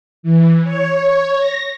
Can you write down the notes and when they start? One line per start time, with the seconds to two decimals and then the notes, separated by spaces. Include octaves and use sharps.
0.23 E3
0.64 C#5
1.38 A#6